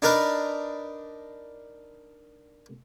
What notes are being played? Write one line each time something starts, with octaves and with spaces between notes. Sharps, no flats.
D4 D#4 A#4 B4